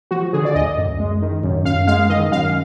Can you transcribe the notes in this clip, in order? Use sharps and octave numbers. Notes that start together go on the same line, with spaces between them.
F3 F#4
D3 G#4
D5
D2 D#5
F#2
G#3
D#3
F#2
F#2 F5
G#3 F5
D#3 D#5
F#2 F5